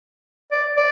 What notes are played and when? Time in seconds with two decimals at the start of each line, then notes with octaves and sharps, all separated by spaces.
0.51 D5
0.76 D5